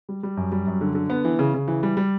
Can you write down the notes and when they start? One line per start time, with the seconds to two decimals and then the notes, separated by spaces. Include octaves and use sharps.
0.09 G3
0.23 G3
0.37 F#2
0.52 G3
0.67 F#2
0.81 D3
0.95 D3
1.10 B3
1.25 E3
1.39 C#3
1.54 C#3
1.68 E3
1.83 G3
1.97 G3